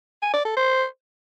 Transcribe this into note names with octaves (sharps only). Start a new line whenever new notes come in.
G#5
D5
A4
C5